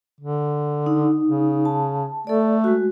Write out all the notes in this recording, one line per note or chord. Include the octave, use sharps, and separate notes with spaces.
D3
D#4
C#3
A5
A3 A4 D5
G#3 F#4